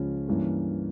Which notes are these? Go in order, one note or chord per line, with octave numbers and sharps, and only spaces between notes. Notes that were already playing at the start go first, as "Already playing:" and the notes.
Already playing: C#2 C#3 F3 C#4
G2 E3 A#3 C#4